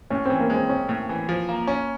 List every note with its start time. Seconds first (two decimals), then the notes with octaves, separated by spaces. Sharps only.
0.10 A2 C#4
0.26 E3 C4
0.40 A#3
0.50 G#3
0.55 C4
0.69 C4 C#4
0.89 A2
1.09 E3
1.29 F3
1.49 A#3
1.67 C#4